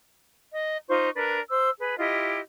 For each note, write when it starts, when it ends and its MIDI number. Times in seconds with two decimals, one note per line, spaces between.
0.52 0.79 75
0.88 1.10 63
0.88 1.10 65
0.88 1.10 72
0.88 1.10 85
1.15 1.40 62
1.15 1.40 70
1.15 1.40 71
1.49 1.70 72
1.49 1.70 88
1.78 1.94 68
1.78 1.94 71
1.98 2.40 64
1.98 2.40 65
1.98 2.40 67
1.98 2.40 75